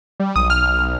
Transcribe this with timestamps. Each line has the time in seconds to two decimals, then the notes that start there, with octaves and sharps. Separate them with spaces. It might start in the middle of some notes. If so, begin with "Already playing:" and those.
0.20 G3
0.36 B1 D#6
0.50 F6